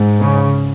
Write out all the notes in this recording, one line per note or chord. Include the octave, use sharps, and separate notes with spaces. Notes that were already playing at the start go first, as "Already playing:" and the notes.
Already playing: G#2
C#3